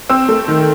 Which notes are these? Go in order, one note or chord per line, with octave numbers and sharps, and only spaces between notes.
C4 E6
A3
D#3